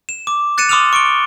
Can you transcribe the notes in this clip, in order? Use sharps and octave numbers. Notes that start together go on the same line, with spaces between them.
E7
D6
F#6 A6 C#7 D#7 E7
C6 D6 D#6 F6 D#7 F7
C#6 C#7 D7 G7